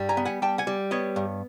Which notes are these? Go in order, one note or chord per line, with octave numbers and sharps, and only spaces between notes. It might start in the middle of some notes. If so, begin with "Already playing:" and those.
Already playing: G2 G3
G#5 A#5
B3
F#5 G#5
G3 G5 A5
F#5 G#5
G3
B3 C#5 D#5
G2